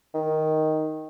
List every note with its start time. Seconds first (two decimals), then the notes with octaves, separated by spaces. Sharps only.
0.14 D#3